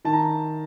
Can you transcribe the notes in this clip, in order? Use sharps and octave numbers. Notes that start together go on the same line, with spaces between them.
D#3 A5
A#5